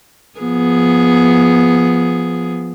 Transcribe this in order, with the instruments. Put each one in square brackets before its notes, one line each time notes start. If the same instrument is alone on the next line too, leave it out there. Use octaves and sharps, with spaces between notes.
[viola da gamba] F3 B3 G#4